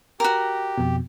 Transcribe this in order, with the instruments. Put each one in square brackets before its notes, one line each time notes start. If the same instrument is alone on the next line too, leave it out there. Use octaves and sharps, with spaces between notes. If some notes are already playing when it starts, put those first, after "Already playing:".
[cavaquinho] F#4 A#4 [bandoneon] G4
[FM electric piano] F2 B2